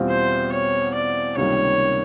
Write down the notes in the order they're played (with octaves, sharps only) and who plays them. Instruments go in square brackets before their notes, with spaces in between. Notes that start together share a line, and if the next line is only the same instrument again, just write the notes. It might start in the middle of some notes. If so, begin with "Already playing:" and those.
Already playing: [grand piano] E2 B2 G3 C4 F4
[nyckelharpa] C5
C#5
D5
[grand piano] C#2 C3 D#3 G3 A#3 [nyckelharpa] C#5